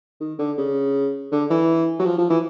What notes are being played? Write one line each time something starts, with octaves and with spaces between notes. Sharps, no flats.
D#3
D3
C#3
D3
E3
F#3
F3
F3
E3